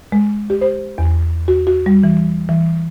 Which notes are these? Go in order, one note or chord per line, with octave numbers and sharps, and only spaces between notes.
G#3
G4
C5
E2
F#4
F#4
G3
E3
E3